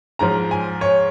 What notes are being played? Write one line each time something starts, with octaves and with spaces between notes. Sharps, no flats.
G#2 F3 A#5
G#5
C#5